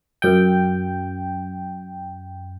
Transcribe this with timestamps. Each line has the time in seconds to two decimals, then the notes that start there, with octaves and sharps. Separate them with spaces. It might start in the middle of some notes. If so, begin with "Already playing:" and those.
0.22 F#2 G5